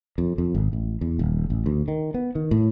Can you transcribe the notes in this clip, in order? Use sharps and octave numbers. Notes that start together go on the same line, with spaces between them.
F2
F2
G#1
A1
E2
D#1
A1
D2
D#3
B3
D#3
A2